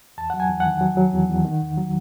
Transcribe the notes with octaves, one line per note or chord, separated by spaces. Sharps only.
E2 A5
F#3 F#5
G#5
E2
F#5
D#3
F#3
F#3
E2
E2
D#3
E2
F#3